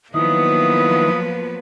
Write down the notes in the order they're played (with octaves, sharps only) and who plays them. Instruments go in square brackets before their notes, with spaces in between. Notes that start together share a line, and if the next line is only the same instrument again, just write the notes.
[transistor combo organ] D#3 E4 [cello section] F3 F#3 B3 [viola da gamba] A#3 B4 [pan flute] D#6